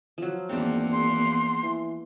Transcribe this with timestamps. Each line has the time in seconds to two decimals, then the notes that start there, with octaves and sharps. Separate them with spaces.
0.18 F3 F#3
0.49 G#1 E2 A#3 C4 D4
0.92 C6
1.63 E3